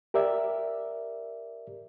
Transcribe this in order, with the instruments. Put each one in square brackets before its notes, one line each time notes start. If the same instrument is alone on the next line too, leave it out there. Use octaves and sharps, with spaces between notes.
[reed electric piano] G4 A#4 D5 E5